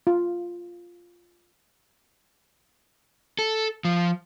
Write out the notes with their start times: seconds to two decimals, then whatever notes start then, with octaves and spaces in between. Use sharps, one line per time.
0.07 F4
3.39 A4
3.85 F3